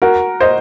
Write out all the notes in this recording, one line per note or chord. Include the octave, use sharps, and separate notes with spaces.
F#4 A#4
C5 D#5